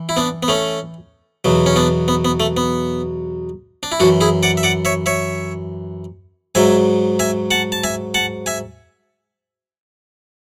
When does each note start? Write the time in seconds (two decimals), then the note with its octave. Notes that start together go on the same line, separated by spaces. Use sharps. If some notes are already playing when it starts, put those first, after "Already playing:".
Already playing: E3
0.09 E4
0.17 B3 D4
0.43 B3
0.48 A3 C#4
1.45 E2 B2 F#3
1.66 C#4
1.76 B3 D4
2.08 B3
2.25 B3
2.40 A3
2.57 B3
3.83 D4
3.92 E4
4.00 F#2 E3 D4 F#4
4.21 E4 G#4
4.43 D5 F#5
4.57 E5
4.63 D5 F#5
4.85 C#5 E5
5.06 C#5 E5
6.55 G#2 F#3 E5 G#5
7.19 E5 G#5
7.51 F#5 A5
7.72 A5
7.84 E5 G#5
8.14 F#5 A5
8.46 E5 G#5